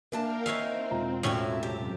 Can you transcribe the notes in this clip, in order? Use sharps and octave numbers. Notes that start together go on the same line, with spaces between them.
E3 A#3 D4 A#4 F5 G5 A5
E3 C4 D#4 C#5 E5 F5
E1 F4 A#5
A2 D3 C#4 E4 F#4 E5 A5
F#2 C3 G4